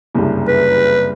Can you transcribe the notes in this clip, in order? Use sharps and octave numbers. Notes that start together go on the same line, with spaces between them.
F#1 C2 G2
B4